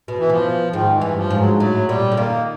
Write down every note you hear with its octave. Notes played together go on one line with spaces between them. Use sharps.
B2
E3
B2 F3
G#2 D#3
E3
G2
F3
G#2
F#3
A2 F#3
A#2 G3
D3
D#3 A#3